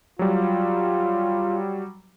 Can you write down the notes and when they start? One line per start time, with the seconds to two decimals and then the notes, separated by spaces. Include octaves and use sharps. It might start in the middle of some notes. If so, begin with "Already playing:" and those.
0.19 F#3 G3 F4